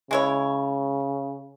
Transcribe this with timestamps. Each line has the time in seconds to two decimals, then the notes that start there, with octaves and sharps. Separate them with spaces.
0.11 C#3 G#3 E4 C#5